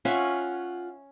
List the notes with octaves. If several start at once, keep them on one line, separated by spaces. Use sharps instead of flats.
C#4 F4 E5 F#5